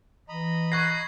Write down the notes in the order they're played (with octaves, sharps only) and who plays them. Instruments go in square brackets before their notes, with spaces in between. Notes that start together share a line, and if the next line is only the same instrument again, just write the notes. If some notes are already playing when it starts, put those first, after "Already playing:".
[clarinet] E3 [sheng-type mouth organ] D#5 A#5 B5
[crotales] C#6 G#6 C7 [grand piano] F#6 A#6